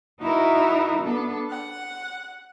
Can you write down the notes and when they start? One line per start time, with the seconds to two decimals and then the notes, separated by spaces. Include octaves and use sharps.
0.20 D#4 E4 F#4 A#4 E5
1.02 B3 D4 A4
1.48 F#5